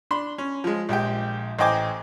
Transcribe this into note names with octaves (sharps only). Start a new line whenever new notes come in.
D4 B5 C6
C#4
F3 G#3
A#1 G#3 G4 G5
A1 C5 D#5 G5 G#5 D6